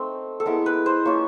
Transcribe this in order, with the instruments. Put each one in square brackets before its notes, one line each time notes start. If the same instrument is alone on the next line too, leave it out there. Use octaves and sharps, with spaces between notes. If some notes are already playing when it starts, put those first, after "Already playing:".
Already playing: [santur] A3 C4 D#4
A4
G#3 B3 E4 A#4
B4
C5
A#3 C#4 F4 C#5